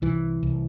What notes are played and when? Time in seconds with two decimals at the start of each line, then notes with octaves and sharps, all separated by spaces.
0.02 C2 E3
0.43 C2